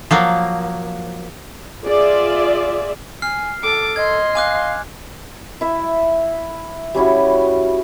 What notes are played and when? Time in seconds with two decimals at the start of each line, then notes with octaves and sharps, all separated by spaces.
0.11 F3 F#3 A#3
1.84 F4 G#4 D5 E5
3.22 G#5 F6 C7
3.63 A4 D6
3.96 D#5 C6 G#6
4.35 F5 G#5 D6 F#6
5.61 E4 E5
6.95 G3 C#4 E4 F#4